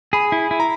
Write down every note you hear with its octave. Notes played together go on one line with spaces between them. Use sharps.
G#4 B5
E4
E4
A#5